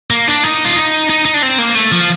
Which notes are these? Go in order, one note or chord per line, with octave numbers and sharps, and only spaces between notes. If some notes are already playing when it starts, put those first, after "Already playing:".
A#3
D4
D#4
F4
D#4
D#4
D#4
D4
C4
A#3
A3
F3